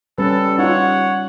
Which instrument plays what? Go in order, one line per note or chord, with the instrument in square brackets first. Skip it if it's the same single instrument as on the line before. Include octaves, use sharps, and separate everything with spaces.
[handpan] G3 C#4 [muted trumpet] A4 [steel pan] B4
[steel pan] D#4 F4 [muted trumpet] C#5 [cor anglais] F#5